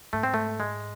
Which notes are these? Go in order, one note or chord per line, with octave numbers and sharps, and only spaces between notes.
G#2 A3
C4
A3
G#3